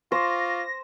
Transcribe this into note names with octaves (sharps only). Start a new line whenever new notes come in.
F4 C5 C#6 D6 A#6